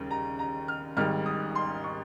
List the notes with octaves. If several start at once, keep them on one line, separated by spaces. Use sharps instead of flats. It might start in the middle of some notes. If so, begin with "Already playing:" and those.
Already playing: D#2 C#3 G3
A#5
A#5
F6
G#1 G#2 D#3 G3 F6
D#6
C6
C#6